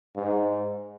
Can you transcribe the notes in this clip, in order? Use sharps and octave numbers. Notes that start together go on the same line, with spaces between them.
G#2